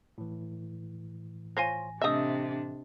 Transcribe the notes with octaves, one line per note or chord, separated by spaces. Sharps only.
A2 E3
F4 C5 C#5 G#5 A#6
C3 A3 D4 D#5 E5 D#6